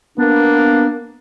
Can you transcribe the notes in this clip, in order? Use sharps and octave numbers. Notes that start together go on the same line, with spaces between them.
A#3 B3 D4